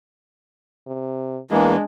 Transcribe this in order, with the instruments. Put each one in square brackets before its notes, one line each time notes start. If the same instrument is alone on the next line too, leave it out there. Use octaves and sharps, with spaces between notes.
[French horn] C3
[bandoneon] E2 E3 [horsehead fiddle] G#3 D4 [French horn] A#3